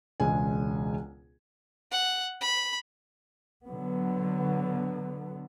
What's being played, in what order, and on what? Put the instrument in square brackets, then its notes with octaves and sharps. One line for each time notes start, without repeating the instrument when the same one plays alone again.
[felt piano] E1 C#2 G#3 G#5
[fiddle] F#5
B5
[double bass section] D3 F#3 B3